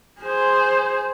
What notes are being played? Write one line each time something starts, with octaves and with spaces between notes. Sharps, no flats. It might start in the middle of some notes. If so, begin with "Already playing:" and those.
G#4 C5